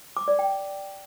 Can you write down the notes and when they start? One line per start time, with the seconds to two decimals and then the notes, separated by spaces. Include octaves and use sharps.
0.17 D6
0.28 D5
0.39 G5